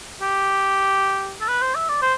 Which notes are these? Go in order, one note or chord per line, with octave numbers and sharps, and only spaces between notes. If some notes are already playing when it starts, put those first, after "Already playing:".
G4
A4
B4
C5
E5
D5
C5